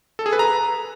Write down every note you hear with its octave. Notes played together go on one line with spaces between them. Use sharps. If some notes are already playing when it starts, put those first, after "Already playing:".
A4
G#4
B4
A#5